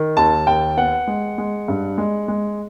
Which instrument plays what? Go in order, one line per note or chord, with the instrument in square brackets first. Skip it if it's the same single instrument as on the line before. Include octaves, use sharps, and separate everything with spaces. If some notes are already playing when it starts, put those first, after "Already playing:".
Already playing: [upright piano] D#3
D#2 A5
D#2 G5
B3 F#5
G#3
G#3
G2
G#3
G#3